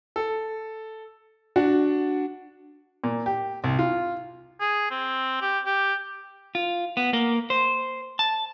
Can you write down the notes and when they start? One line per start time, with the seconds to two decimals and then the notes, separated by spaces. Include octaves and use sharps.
0.16 A4
1.56 D4 F#4 F#5
3.04 A#2
3.26 G4
3.64 C2
3.79 F4
4.60 G#4
4.90 C4
5.41 G4
5.66 G4
6.55 F4
6.97 B3
7.13 A#3
7.50 C5
8.19 A5